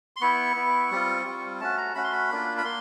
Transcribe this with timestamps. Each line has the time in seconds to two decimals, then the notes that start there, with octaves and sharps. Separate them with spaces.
0.16 C6
0.21 B3 E4 C#6
0.56 B3 E4
0.91 G3 C4 F4
1.25 G3 C4 F4
1.60 A3 C#4 F#4 A5
1.77 A#5
1.95 A3 C#4 F#4 B5
2.04 C6
2.12 B5
2.30 A#3 D4 F4
2.58 B5
2.64 A#3 C6